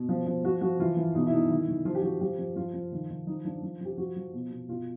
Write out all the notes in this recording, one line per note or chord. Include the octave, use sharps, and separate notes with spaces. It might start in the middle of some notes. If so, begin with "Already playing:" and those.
Already playing: B2
F3
F3
F3 F#4
F3 F#4
E3 F4
E3
B2 D#4
E4
B2 D#4
D#3 E4
D#3
F3 F4
G4
F3 F#4
F3 G4
F3
F3 F4
F3
D#3
D#3
F3 D#4
F3 D4
F3
F3 G4
F3 F#4
F3
B2
B2
B2 F4